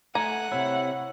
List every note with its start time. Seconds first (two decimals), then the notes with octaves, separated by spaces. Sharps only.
0.15 A3 F#5 G#5 A#5
0.52 C3 E4 C#5